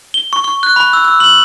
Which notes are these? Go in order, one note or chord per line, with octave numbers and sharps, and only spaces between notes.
G7
C#6
C#6
F#6
B5
E6
E6
F#7